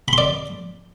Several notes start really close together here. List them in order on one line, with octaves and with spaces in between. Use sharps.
B5 C6 D5